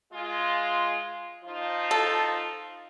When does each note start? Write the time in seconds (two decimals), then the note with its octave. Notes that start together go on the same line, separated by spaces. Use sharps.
0.13 G#3 F4
1.45 F3 D#4 F4
1.91 A4